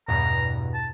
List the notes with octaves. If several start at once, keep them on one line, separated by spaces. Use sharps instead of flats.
E2 G2 B2 A#5
A5